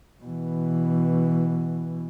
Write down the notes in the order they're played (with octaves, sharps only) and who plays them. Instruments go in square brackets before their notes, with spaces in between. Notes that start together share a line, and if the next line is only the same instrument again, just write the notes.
[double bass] B2 E3